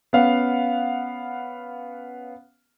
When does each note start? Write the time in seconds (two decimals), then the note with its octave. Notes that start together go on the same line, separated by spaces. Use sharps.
0.13 B3 C#4 F5 F#5